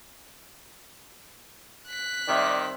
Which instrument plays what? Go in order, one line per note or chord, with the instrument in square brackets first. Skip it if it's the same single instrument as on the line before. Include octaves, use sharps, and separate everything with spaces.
[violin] F#6 B6
[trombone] D#3 [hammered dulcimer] G3 C4 E5 [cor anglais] D5